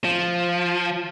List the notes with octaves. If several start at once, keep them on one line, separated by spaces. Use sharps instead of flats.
F3